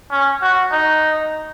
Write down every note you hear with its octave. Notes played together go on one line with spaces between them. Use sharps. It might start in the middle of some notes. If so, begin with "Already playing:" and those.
C#4
F#4
D#4